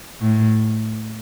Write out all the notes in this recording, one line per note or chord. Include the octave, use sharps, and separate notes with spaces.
A2